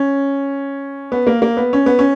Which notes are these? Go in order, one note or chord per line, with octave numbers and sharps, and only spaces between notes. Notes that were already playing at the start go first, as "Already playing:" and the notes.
Already playing: C#4
B3
A#3
A#3
B3
C#4
B3
C#4